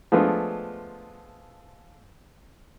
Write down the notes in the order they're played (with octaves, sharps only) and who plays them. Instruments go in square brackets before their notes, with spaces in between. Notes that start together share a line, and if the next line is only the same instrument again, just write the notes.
[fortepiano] F3 G#3 A3 B3 D4 F4